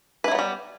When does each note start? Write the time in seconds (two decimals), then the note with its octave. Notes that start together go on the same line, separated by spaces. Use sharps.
0.24 B4
0.28 E4
0.31 F#3
0.35 B3
0.39 G3